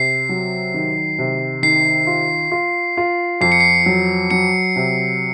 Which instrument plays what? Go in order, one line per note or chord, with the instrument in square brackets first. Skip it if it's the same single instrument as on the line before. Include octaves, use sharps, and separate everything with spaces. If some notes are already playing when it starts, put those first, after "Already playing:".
Already playing: [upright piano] C3 [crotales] C7
[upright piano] F#3
D#3
C3
[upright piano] D#3 [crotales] C7
[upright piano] F4
F4
F4
[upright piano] F2 [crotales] C7
[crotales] C#7
C7
[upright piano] F#3
[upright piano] F#3 [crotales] C#7
[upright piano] C3